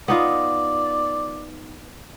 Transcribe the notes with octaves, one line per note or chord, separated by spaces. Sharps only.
B3 D#4 F4 D5